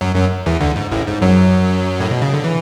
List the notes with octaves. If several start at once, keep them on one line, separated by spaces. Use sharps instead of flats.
F#2 F#3
F#2 F#3
E2 E3
D2 D3
G#2
A1 A2
G#2
F#2 F#3
A2
B2
C#3
D3
E3